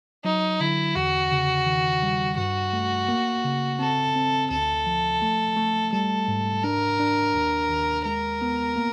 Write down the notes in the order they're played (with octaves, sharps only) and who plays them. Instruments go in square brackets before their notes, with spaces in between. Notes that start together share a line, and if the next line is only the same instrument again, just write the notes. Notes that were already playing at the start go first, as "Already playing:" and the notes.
[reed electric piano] F#3 [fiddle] D#4
[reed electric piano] D3 [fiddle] E4
[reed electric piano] E2 [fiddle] F#4
[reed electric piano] C#3
D#3
G3
[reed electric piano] G2 [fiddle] F#4
[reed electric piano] A3
A#3
C#3
[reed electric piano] C4 [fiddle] A4
[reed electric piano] C4
[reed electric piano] D2 [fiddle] A4
[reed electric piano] F3
A3
A3
[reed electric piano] G3 [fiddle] A4
[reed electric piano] G#2
[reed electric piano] D4 [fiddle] A#4
[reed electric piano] D4
D#2
D#2
[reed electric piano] G#3 [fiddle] A#4
[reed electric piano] B3
A#3